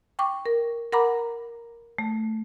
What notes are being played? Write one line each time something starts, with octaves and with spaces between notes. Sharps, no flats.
G5 C#6 D6
A#4
A#4 F#5 A#5 B5 D6
A3